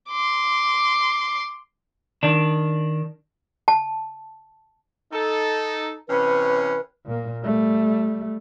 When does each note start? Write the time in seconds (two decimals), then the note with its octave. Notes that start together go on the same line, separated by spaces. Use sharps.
0.10 C6 D6
2.23 D#3 D4
3.68 A5
5.12 D#4 A4
6.09 C3 E3 C#4 B4
7.06 A#2 A#3
7.44 G3 A3